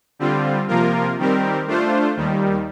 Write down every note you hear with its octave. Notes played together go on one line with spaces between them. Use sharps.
D3 G3 C4 F4
C3 F3 A#3 F4 A#4
D#3 G3 C4 G4 A#4
A3 D4 F4 C5
D#2 D#3 G3